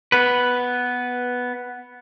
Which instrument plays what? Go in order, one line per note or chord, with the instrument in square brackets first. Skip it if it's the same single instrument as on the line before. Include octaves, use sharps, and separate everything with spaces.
[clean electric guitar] B3 B4